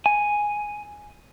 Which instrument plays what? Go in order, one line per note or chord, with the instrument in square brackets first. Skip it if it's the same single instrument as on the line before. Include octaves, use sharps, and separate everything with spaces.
[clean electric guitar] G#5